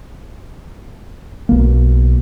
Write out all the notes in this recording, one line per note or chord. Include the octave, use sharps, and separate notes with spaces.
B1 A#3